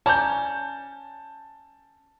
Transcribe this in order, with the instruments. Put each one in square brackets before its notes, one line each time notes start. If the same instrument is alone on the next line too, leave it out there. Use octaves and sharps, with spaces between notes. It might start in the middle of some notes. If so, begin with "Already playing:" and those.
[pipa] C#4 D5 A#5 [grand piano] A5 G6